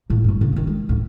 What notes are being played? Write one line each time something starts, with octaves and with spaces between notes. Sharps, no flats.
A2 A#3
G2 E3
G#2 C#3
D#3 F3
G#3
D2 A2